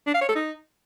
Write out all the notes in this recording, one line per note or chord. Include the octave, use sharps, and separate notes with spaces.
D4
F5
C#5
A4
D#4